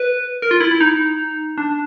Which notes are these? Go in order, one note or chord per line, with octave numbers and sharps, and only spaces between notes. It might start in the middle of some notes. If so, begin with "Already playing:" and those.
Already playing: B4
A#4
F4
E4
E4
D#4
D4